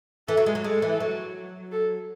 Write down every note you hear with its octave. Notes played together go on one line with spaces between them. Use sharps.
E3 A4
F#3
G#3
F#3
G#3 A4
E3
F#3
A4